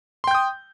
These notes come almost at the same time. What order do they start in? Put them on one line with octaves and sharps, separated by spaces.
C6 G5 G6 D#6